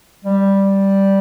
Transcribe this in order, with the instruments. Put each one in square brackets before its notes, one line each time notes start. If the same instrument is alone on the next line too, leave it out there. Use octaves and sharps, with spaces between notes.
[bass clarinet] G3